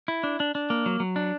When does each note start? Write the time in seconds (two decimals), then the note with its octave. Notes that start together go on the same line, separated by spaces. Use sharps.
0.08 E4
0.23 D4
0.40 D4
0.55 D4
0.70 A#3
0.86 F#3
1.00 F#3
1.16 D4